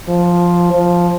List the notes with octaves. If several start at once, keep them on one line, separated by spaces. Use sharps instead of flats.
F3
F3